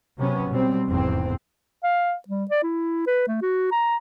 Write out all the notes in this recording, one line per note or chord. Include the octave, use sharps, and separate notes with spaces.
C3 F#3 B3 C#4
B2 G3 C4
F1 E2 G#2 C4
F5
G3
D5
E4
B4
A3
F#4
A#5